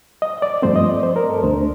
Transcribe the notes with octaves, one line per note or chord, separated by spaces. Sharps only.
D#5
D5
G2 F3 A3 C4 C5
D#5
D5
C5
A#4
A4
D2 D3 A3 D4 C5